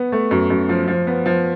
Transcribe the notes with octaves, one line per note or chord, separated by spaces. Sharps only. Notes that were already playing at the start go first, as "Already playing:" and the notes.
Already playing: B3
A3
F#2
F#2
F3
F3
B3
F3